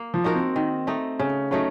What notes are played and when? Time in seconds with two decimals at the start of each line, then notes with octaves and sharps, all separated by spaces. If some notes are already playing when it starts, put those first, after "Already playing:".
Already playing: A#3
0.14 F3
0.24 D#4 F#4 A#4
0.35 C4
0.56 D#3
0.87 A3 D#4 A4
1.19 C#3 C#4
1.51 F#3 A3 C#4 D#4